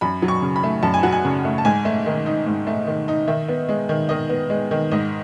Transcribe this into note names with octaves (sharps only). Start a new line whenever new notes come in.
F#2 B5
F#3
C#6
C#3
B5
A3
F#2 A5
G#5
F#3 F#5
G#5
C#3
A3
A5
G#2 G#5
A3
D#3
D#4
G#2
A3
D#3
D#4
D#3 E5
B3
G#3
D#3
D#3 D#5
B3
G#3
D#3
G#2 D#5